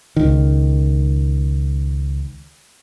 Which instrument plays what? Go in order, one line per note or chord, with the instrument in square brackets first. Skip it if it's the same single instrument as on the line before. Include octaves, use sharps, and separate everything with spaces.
[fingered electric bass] C#2 D#3